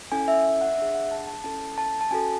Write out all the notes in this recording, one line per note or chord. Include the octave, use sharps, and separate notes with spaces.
C#4 E4 A4 G#5
E5
E5
F#5
D4 G#4 E5
F#5
A5
A5
C#4 E4 A4 A5
A5
A5
C#4 F#4 A4 G#5